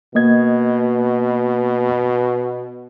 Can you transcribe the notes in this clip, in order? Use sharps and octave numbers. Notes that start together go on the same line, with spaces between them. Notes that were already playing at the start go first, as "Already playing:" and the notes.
B2 A#3 D#5 G#6